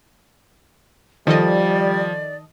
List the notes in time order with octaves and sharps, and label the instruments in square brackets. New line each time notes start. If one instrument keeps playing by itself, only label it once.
[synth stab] D#3 A4 D#5 [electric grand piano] F3 [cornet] G3 [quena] D5